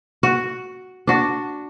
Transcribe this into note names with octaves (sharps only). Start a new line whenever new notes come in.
F#4
D4 F#4